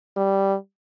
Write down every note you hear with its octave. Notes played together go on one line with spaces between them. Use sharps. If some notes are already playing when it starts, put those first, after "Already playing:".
G3